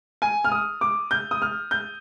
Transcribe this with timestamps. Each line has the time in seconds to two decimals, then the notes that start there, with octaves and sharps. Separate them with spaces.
0.22 G#5
0.45 F6
0.52 D#6
0.81 D6
1.11 G6
1.31 D#6
1.42 F6
1.71 G6